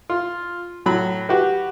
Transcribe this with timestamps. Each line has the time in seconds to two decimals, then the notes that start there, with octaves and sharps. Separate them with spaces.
0.10 F4
0.86 A2 F#3 B5
1.29 F#4 G4 B4